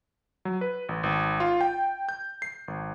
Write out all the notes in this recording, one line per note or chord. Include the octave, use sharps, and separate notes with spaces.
F#3
B4
A1
G#1
F4
G5
G6
C7
G#1